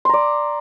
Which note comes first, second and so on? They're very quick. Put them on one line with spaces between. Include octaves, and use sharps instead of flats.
C6 A#5 D5